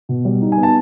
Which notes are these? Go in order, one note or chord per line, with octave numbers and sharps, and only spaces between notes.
B2
G3
D#4
G#5
B3
A5